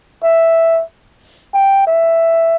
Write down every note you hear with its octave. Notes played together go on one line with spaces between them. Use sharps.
E5
G5
E5